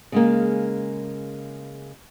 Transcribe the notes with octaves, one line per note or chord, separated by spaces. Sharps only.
C#3 G#3 A#3